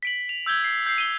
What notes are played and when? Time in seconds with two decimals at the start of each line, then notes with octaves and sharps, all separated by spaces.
0.03 B6 D7 F#7
0.29 F7
0.46 E6 G6 G#6 G7
0.64 C7
0.87 G6 C7
0.98 D#7 G7